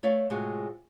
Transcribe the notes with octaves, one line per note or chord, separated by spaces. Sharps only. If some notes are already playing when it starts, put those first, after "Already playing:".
A3 C#5 D5 E5 F5
A2 C3 G#3 F4 F#4 G#4